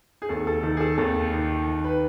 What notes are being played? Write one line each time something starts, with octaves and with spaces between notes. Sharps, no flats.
G#4
D#2 A4
A4
D#3 A4
G#4
A4
D#2 A4
D#3
D#3
B4